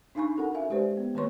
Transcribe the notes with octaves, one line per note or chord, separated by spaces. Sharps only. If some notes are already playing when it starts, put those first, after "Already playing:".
D4 D#4 F5 G#5 B5 C#6
C#4 F#4 A4 A#4 F#5
E5 F5 G#5
G#3 G4 B4 C5 D5
B3
D#3 A#3 B4 C#5 C6 C#6